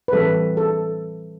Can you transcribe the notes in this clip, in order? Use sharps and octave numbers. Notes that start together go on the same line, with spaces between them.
B4
E3 G3 C4 A4
A4